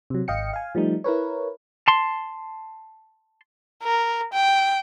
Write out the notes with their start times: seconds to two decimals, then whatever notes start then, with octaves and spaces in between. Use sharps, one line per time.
0.10 C3 F#3
0.28 G#1 D#5 F5 G5 C#7
0.53 F5 G#5
0.75 F3 G3 A3 D#4
1.04 E4 A#4 B4 C#5
1.88 A5 C6
3.83 A#4
4.33 G5